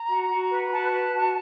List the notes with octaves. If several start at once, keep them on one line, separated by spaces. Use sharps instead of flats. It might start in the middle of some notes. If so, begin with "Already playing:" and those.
Already playing: A#5
F#4
F#4
B4
F#4 A5
B4
F#4